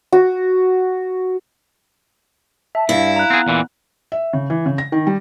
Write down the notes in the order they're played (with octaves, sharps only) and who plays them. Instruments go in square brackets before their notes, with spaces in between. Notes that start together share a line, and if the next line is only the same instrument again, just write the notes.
[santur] F#4
[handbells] E5 [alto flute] A5
[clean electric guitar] G2 [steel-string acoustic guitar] E4 [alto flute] F5
[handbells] A#5 F#6
[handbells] B3 [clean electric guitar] C4 G#4
[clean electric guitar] E2 A#2 E3
[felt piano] E5
C#3
E3
C#3
A#6
D#3
G3